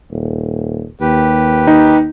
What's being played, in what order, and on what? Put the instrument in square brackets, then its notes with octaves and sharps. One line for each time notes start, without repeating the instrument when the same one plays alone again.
[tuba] D#1
[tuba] D#2 [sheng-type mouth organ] G4 B4
[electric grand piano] D#4